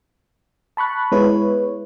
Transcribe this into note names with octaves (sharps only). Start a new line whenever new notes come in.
A5 B5 C#6 F#6
G#3 B3 E4 B4 C#5